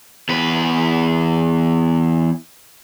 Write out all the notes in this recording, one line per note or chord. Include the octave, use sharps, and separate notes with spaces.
E2 B4